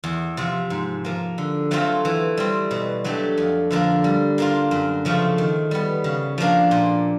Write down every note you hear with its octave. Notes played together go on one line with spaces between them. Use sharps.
E2
C3 F3
G#2
F3 A#3
D3
F#3 A3 C4 F4
E3
G3 C4
B2
F#3 A3 D4 G4
F2
D3 F3 A#3 D4
G3
A#3 D4 F4
F#2
C#3 F3 A3 C4
D#3
G3 B3
C#3
F3 A#3 D4
A#2